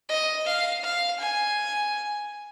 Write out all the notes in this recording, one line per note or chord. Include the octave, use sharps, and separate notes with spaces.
D#5
F5
F5
G#5